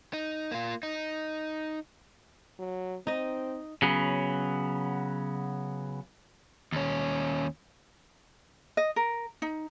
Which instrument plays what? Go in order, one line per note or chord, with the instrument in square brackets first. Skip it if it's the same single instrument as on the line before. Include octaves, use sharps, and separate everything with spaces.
[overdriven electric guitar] D#4
A#3 F4
D#4
[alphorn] F#3
[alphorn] C4 [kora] D#4 D#5
[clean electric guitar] C#3 F#3 B3
[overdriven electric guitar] D#2 C#4
[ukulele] D#5
A#4
D#4